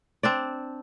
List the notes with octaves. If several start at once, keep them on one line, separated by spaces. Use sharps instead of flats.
C4 D4 D5